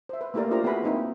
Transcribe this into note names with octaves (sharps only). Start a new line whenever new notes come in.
C5 E5
B4
A3 A#3 E4 G4 A#4 D5
D4 F4 G4 C5 A#5
B3 E4 F#4 G#4 B4 B5
A#3 C4 D#4 E4